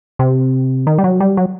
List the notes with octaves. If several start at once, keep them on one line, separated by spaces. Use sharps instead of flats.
C3
D#3
G3
F#3
G3
F#3